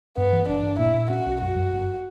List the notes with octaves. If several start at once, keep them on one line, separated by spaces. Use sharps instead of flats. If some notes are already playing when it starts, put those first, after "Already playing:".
G2 B3
E3
G1 D4
G1
A#2 E4
A#2
C#4 F#4
B1
F#2 F#4
F#2
G1